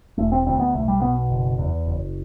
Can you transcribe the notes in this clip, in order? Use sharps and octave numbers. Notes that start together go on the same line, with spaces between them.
E1 A3
C4
D2 C4
B3
B1 A3
G3
B2 B3
F#1
E2
F#1